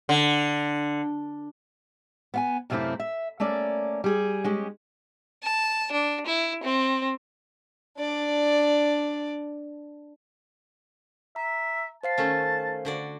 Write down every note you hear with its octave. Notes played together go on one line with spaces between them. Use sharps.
D3
B3 F5 G#5
F#2 C3 A3 A#3 C4 E4
E5
A3 A#3 C#4 D5
G3 G#4
G#3 C#4 G4
A5
D4
E4
C4
D4 D5
E5 A#5
C5 F5 A5 C7
D#3 A3 C#4
D3 F#4 D5